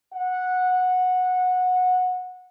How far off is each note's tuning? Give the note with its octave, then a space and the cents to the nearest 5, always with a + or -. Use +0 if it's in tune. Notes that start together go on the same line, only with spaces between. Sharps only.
F#5 -15